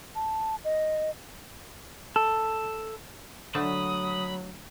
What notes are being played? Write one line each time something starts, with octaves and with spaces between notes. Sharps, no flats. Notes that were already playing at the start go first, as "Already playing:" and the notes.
A5
D#5
A4
D3 F#3 A3 A5 B5 D#6